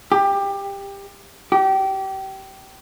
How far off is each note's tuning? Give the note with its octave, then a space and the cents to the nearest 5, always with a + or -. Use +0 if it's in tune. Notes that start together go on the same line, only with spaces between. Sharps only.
G4 +20
G4 -25